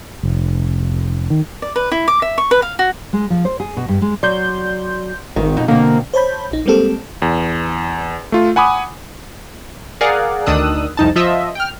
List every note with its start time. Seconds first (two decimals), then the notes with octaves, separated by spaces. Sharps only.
0.23 F1
1.30 D#3
1.62 D5
1.76 B4
1.92 E4
2.08 D6
2.22 E5
2.38 C#6
2.51 B4
2.62 F5
2.79 F#4
3.13 G#3
3.30 F3
3.45 C5
3.60 G#4
3.77 B2
3.88 G2
4.02 G#3
4.23 F#3 D5 C6 G6
5.36 G#1 D#3
5.57 F2 B2 D#4
5.68 B2 D3 A#3 C4
6.13 C5 C#5 A5 B5 G6
6.51 A#1 D#4
6.66 G3 G#3 A#3 C4 G4 A4
7.22 E2
8.32 A3 F4
8.56 F#5 G#5 B5 D6 D#6
10.01 G#4 A#4 D5 F5 F#5
10.46 D2 D#3 D4 D#6 E6 F#6
10.97 C2 F2 D#4 A5
11.16 F3 F4 D#5 E5
11.55 G5 F6